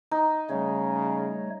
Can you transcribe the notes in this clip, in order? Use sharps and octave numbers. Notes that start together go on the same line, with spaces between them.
D#4
C#3 G3 A3 C#5